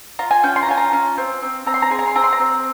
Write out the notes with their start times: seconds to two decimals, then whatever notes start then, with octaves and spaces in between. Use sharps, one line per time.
0.19 F4 A#5
0.31 G#5
0.43 C#4 G5
0.56 C6
0.63 A#5
0.68 F4 G#5
0.78 A#5
0.93 C#4
1.18 C4
1.42 C4
1.66 C4 A#5
1.74 C6
1.82 A#5
1.91 G#4 C6
1.99 A#5
2.08 C6
2.15 C4 A#5
2.24 C6
2.33 A#5
2.40 C4